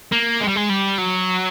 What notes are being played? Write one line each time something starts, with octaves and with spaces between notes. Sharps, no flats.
A#3
G#3
G3
G#3
G3
F#3